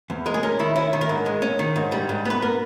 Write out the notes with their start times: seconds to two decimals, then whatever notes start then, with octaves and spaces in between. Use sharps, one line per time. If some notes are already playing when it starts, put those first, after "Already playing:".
0.10 E2
0.26 G#3 A#4
0.34 G#4
0.43 C#4 A#4
0.59 D#3 E4
0.76 C#4 E4
0.93 D#3
1.01 A#4
1.09 G#2
1.26 G#3
1.42 C#4
1.59 D#3
1.76 G#2
1.92 G3
2.09 G#2
2.25 B3 B4
2.42 A#4